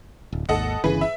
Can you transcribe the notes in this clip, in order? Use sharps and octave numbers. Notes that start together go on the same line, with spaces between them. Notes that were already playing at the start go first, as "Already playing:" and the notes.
D1
G#1 D#2 A4 D#5 F#5
G1 C#3 E3 G#4 B4
E5